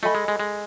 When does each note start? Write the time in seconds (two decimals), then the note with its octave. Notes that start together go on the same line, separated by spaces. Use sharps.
0.03 A3 A4 D#5 G#5 B5
0.15 G#3
0.28 G#3
0.40 G#3